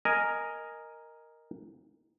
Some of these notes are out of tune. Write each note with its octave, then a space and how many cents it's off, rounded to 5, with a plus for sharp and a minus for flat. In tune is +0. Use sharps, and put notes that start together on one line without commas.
A#4 +0 D#5 +0 G#5 +0